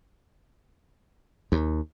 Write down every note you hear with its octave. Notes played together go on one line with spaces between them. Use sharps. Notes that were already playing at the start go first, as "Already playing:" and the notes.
D#2